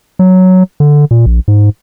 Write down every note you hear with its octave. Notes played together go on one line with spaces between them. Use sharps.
F#3
D3
A#2
A#1
G#2